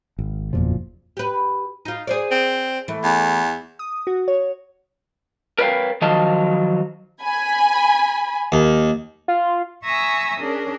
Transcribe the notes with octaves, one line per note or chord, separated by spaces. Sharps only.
G#1
F#1 E2 A#2 F3
G4 B4
D#4 F4
G#4 C5 D5
C4
E3 A3
E2
D#6
F#4
C#5
A#4 B4 C#5 D5 F5 G5
D#3 F3 F#3 D#5 F5 A5
G#5 B5
D#2
F4
E5 G#5 A#5 C#6 D#6 E6
C#4 D4 G#4 A#4